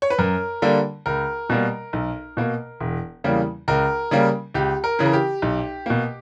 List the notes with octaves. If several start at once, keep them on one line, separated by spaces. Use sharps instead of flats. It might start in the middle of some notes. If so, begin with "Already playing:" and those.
C#5
B4
F#2 A#4
D3 G3 A#3
C#2 A#4
B2 G3 A#3
B1
B2 A#3
E1
E2 C#3 G3 A#3
C#2 A#4
C#3 G3 A#3
C#2 G4
A#4
C#3 E3
A#4
G4
B1
B2 A#3